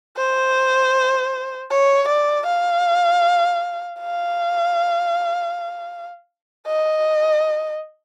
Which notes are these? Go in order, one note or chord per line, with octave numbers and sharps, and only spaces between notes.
C5
C#5
D5
F5
F5
D#5